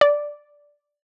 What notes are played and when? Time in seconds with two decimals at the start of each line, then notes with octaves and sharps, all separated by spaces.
0.01 D5